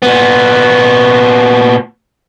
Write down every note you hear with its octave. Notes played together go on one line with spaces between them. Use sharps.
A#2 B3